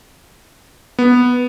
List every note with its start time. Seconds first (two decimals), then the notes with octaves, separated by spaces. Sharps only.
0.99 B3